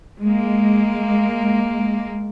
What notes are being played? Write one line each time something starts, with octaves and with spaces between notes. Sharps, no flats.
G#3 A#3